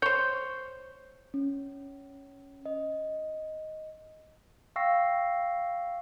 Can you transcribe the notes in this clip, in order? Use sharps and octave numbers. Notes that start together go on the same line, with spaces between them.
C5 C#5 G6
C#4
D#5
F5 G5 C#6 E6 A#6 C7